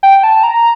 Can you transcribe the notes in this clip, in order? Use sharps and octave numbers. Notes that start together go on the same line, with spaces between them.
G5
A5
A#5